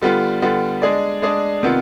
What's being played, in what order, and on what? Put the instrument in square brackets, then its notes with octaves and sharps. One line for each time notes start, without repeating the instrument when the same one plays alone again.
[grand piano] D3 G3 B3 F4
D3 G3 B3 F4
G#3 D4 G#4 D5
G#3 D4 G#4 D5
C3 D#3 B3 F4